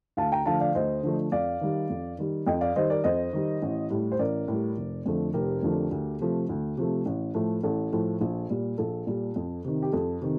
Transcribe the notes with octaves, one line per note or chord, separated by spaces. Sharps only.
D2 F5 A5
G5 A#5
D3 F3 A3 F5 A5
D5 F5
D2 C5 D#5
D3 F3 A3
F2 D5 F5
D#3 G3
F2
D#3 G3
F2 D#5 G5
D5 F5
D#3 G3 C5 D#5
A#4 D5
F2 C5 D#5
D#3 G3
A1
A2 G3
C5
A1 A#4 D5
A2 G3
F1
F2 D3 F3 A3
F1 G4 A#4
F2 D3 F3 A3
D2
C3 F3 A3
D2
C3 F3 A3
A1
A2 F3 A3
A1 A4
A2 F3 A3
A#1
A#2 G3
A#1 A4
A#2 G3
F2
C3 D#3
G4
F2 A4
C3 D#3